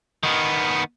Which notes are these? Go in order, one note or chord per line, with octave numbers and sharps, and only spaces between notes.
D#3 B3